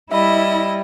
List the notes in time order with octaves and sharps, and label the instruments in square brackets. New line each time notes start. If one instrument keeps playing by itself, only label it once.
[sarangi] G3 [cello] E4 [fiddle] D#5 [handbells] E5 B5